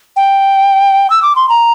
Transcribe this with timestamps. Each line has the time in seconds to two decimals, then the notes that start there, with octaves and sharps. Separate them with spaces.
0.16 G5
1.10 E6
1.22 D6
1.36 C6
1.49 A#5